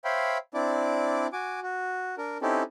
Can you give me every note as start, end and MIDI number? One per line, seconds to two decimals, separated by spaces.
0.05 0.38 72
0.05 0.38 73
0.05 0.38 76
0.05 0.38 77
0.05 0.38 79
0.05 0.38 83
0.54 1.27 60
0.54 1.27 62
0.54 1.27 64
0.54 1.27 74
1.33 1.60 66
1.33 1.60 80
1.33 1.60 86
1.63 2.15 66
2.18 2.38 62
2.18 2.38 70
2.42 2.63 60
2.42 2.63 61
2.42 2.63 63
2.42 2.63 64
2.42 2.63 67
2.42 2.63 69